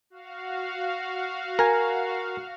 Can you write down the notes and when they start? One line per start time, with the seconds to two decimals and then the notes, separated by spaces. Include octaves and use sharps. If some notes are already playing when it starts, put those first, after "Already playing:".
0.10 F#4 F5
1.59 A#4 G#5